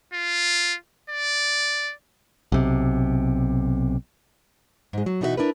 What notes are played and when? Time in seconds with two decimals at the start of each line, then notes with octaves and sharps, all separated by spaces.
0.14 F4
1.10 D5
2.52 B1 C3
4.93 G#2 G#3
5.06 F#3
5.21 B2 E3 D#4 F#4 B4 E5
5.37 D4 E4 A#4 B4